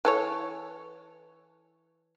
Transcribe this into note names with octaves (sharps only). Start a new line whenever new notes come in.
E3 A4 C#5